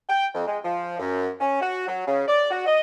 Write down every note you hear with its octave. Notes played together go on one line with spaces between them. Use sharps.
G5
F2
G#3
F3
F#2
C#4
F#4
F#3
C#3
D5
F#4
D#5